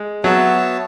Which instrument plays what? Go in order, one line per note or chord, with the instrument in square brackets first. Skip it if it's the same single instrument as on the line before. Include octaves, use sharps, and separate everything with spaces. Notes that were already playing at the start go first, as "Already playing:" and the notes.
Already playing: [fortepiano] G#3
[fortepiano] F#3 [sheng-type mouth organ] B3 F#4 C#5 E5 A5